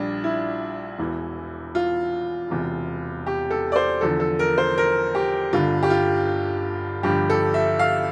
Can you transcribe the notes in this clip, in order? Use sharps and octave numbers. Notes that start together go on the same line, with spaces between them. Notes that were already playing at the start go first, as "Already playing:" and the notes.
Already playing: A#1 A#2 G3 D4
E4
E1 E2 E3
F4
E1 E2 C3
G4
A4
D5
C5
E2 D3 F3 A4
A4
A#4
C5
A#4
G4
G1 G2 D3 F4
G4
F4
G1 G2 F3 G4
A4
E5
F5